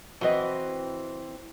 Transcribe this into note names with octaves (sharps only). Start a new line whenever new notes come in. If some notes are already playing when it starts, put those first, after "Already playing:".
E3 C4 F#4 B4 D#5